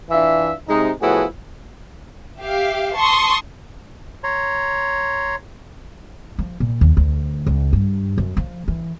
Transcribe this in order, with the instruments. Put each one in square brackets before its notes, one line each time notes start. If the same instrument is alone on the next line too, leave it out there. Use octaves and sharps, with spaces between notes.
[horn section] E3 D4 F4 E5
C3 G#3 D#4
A2 F3 B3 E4 F#4 G#4
[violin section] G4 E5 F5
A5 C6 C#6 D#6
[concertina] C#5 A#5 C6
[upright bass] F3
A#2
D#2
D2
C#2
G2
F#2
F3
E3